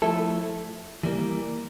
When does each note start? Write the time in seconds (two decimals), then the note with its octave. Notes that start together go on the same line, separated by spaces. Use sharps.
0.02 F3 A3 E4 A4
1.03 E3 G3 A#3